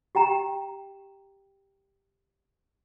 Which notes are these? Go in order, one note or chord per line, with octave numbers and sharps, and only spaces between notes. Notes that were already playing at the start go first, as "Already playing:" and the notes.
G4 G5 A#5